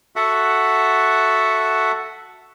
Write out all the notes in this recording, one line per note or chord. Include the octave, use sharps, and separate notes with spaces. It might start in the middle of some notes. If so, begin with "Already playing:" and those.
F#4 A4 E5 F#5